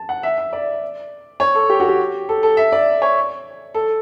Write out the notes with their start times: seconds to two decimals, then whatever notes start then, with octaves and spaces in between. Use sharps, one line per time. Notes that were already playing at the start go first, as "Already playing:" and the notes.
Already playing: A5
0.09 F#5
0.23 E5
0.38 E5
0.53 D5
1.40 C#5
1.55 A4
1.70 G4
1.80 F#4
1.89 G4
2.29 A4
2.43 A4
2.57 E5
2.72 D5
3.02 C#5
3.74 A4